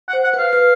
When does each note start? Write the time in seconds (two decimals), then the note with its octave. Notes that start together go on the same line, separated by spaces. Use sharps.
0.08 F#5
0.13 C5
0.24 F#5
0.34 B4
0.38 F5
0.53 B4